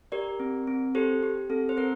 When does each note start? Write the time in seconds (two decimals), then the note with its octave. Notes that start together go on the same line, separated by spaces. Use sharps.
0.12 G4 A#4 D5
0.40 C4
0.67 C4
0.95 G4 A4 C5
1.23 G4
1.50 C4 A4
1.69 C5
1.77 C4 A#4